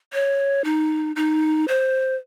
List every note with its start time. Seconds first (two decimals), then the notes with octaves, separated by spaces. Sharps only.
0.13 C#5
0.64 D#4
1.16 D#4
1.68 C5